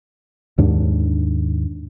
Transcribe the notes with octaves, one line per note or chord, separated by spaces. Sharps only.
D#2 G#2 D4